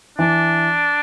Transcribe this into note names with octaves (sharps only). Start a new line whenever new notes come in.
E3 D4